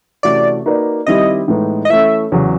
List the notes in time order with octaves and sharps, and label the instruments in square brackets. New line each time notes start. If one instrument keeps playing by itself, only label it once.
[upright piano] C3 E3 A3 C#4 F#4 [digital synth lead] D5
[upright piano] A#3 D#4 F#4 B4 D5
[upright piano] D#3 G3 C4 E4 G4 [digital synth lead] D#5
[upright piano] A2 E3 G#3 B3 D#4
[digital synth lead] D#5
[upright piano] E3 A3 C#4 E4 A4 [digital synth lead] E5
[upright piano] E2 C#3 F#3